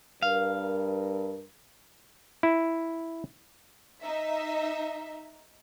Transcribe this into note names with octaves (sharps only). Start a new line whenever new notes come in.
G2 A#4 F5
E4
D#4 E5